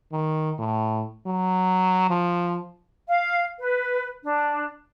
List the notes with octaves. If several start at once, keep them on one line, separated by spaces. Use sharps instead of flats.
D#3
A2
F#3
F3
F5
B4
D4